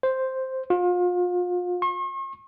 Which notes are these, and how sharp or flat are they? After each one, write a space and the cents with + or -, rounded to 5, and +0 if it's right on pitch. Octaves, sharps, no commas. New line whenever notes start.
C5 +0
F4 +35
C#6 -45